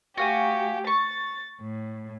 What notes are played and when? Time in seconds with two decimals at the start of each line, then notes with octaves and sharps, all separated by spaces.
0.17 A3 F#4 G4 F5 G#5
0.87 C#6 A6
1.61 A2